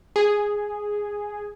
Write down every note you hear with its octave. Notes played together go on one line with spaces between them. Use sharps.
G#4